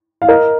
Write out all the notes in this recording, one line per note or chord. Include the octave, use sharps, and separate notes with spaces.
F5
A#4 D#5